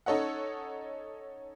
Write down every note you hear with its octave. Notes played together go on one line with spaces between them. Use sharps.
C#4 D#4 A4 C#5 D#5 F#5